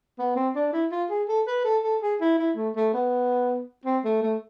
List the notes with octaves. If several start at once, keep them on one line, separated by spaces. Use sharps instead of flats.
B3
C4
D4
E4
F4
G#4
A4
B4
A4
A4
G#4
E4
E4
A3
A3
B3
C4
A3
A3